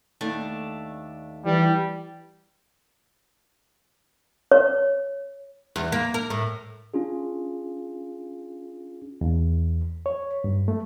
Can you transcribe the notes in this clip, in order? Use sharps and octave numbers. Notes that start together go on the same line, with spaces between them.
D#2 A3 D4
E3 G3
C#5
E2
A#3
A#4
A2
C#4 D4 F4 G#4
E2
C#5
G2
A3